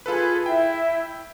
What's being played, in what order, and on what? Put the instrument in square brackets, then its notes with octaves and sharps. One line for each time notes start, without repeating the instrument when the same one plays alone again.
[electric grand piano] F4 A4 B4 [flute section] G#4
[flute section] E4 E5 [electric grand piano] G5